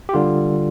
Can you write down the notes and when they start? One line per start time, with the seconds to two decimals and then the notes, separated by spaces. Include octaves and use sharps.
0.09 G4
0.14 D3 G3 F4